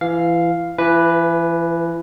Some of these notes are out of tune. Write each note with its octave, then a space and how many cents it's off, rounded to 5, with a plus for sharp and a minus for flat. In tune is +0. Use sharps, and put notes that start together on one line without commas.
E3 +30 F5 +0
E3 +35 B4 +0